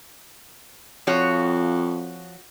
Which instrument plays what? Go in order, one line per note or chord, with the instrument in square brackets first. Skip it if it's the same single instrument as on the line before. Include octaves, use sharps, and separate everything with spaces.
[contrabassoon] F2 [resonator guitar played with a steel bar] F3 F#4 C#5